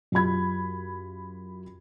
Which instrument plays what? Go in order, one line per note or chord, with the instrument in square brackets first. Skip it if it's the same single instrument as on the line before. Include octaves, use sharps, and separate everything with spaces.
[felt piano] F#2 F4 G4 B5 G#6